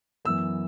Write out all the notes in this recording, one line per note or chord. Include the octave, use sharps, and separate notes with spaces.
F#2 E3 B3 E6